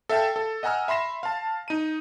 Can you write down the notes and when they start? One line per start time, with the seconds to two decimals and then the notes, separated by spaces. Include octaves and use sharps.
0.09 A4 E5 F5 G5 A5
0.36 A4
0.63 D#5 F#5 G#5 A#5 E6 F6
0.88 E5 B5 C6 A#6 E7
1.23 F5 A5
1.68 D#4 D#7